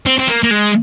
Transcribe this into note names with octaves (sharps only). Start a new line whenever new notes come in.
C4
C4
A#3
A#3
G#3